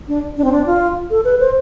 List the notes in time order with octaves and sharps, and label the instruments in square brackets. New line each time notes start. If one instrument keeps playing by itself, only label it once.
[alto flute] D4
D4
C4
D4
F4
A4
B4
C5